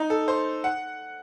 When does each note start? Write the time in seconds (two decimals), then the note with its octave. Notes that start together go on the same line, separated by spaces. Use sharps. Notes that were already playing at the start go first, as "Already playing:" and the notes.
Already playing: D#4
0.10 A4
0.28 C5
0.64 F#5